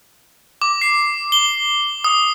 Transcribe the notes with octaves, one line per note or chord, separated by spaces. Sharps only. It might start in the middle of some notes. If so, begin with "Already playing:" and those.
D6
C7
G7
D#6